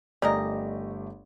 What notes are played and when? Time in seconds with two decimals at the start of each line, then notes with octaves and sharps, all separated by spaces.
0.22 G1 C#3 A3 G4 A#4 D5 D#5